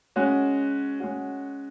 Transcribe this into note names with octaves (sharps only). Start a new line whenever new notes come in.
G#3 C#4 F#4
G#3 C#4 F#4